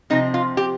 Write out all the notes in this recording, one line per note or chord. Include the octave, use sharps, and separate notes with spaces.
C3 F3 C4 D#4
F4
G4